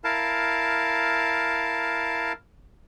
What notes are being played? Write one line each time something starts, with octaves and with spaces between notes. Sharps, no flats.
E4 A#4 F5 A5